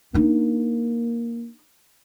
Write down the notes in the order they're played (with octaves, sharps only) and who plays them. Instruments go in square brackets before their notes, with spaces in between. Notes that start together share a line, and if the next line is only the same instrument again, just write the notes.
[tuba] A#3 [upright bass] D4 D#4